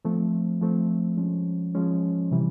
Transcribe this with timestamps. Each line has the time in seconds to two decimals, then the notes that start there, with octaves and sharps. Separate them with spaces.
0.05 F3 A3 C4
0.62 F3 A3 C4
1.17 F3 G#3 C#4
1.75 F3 G#3 C#4
2.31 C3 E3 G3